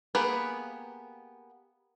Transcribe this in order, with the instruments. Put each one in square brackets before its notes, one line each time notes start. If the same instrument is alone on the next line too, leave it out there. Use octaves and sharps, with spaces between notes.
[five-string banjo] A#3 B3 G4 G#4 B4